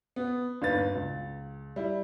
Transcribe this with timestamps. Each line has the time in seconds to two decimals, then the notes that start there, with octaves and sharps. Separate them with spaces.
0.16 B3
0.61 G1 D#2 B4 A6
0.95 C#2
1.76 G3 E4